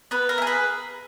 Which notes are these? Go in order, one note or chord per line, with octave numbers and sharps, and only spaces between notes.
B3 B4
A#4
E4
G#4
B4